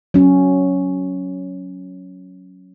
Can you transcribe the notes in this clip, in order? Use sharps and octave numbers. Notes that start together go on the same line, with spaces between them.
F#3 C#4